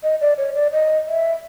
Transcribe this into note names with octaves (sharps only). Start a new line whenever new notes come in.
D#5
D5
C#5
D5
D#5
E5